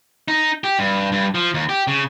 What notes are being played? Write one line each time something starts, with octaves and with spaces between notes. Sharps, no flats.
D#4
G4
G2
G2
F3
D#2
G4
C#3